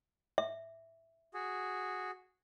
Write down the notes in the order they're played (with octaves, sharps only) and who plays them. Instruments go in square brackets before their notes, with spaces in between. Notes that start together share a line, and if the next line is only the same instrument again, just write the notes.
[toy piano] E5
[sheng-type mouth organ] F#4 G#4